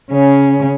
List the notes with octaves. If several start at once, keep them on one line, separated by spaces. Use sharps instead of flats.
C#3 C#4